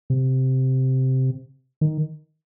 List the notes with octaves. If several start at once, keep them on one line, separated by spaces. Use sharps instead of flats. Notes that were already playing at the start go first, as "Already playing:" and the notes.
C3
D#3